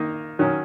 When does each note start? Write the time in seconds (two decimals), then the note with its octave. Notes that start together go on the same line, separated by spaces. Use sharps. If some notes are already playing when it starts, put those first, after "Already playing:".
Already playing: D#3 A#3 D#4
0.39 D#3 F#3 C#4